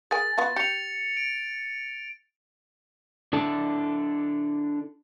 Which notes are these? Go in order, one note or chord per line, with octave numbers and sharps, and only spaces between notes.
G#4 A#4 G#5 A6
B3 F4 F#4
G4 C#7 F7
D7
D4 E4 A4